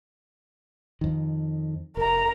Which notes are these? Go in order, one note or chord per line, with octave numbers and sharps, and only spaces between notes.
F2 D#3
F1 A#4 A#5